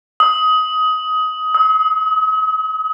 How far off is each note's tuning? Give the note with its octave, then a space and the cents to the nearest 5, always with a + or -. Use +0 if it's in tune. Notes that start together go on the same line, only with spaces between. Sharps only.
D#6 +20
D#6 +45